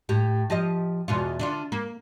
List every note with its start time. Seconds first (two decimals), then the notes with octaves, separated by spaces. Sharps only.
0.09 A2 G4
0.50 F3 G4 D#5
1.08 E2 B2 F4
1.39 D3 D4 F4
1.72 A#3